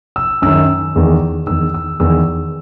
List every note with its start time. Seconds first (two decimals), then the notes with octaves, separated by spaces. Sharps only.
0.16 E6
0.42 F#2 D#3 E6
0.96 E2 D#3
1.47 E2 D#3 E6
1.74 E6
2.00 E2 D#3 E6